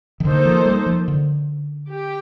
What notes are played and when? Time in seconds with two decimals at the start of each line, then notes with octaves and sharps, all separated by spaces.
0.20 D#3
0.25 D3 A#3 D#4 A4 C5
0.45 F3
0.66 G3
0.86 F3
1.08 D3
1.90 G4